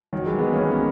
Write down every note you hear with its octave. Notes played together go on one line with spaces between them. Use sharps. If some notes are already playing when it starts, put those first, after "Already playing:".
D#3 F#3
E3 G#3
G#3 B3
A#3 C#4
G#3 B3